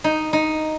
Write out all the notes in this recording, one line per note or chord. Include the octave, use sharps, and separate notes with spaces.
D#4
D#4